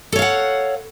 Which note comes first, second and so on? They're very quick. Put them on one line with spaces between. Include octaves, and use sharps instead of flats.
A4 C#5 F5 F#5